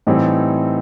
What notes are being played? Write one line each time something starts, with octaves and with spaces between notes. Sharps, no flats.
A2 E3 G3 C4 D#4